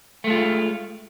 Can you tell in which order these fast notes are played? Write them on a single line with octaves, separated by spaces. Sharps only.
A3 G#3 F4